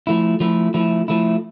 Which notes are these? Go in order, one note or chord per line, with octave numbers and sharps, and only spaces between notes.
F3 A3 E4
F3 A3 E4
F3 A3 E4
F3 A3 E4